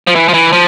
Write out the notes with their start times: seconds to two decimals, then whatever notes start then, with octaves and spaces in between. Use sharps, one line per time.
0.07 F3
0.15 E3
0.28 F3
0.34 E3
0.53 F3